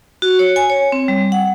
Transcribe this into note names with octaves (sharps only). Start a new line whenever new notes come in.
F#4
C#5
G#5
C#5
C4
G3
F#5